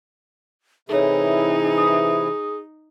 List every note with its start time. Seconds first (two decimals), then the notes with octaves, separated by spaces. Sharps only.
0.89 C3 E3 D#4 E4 G#4 A4 C#5
1.78 D#6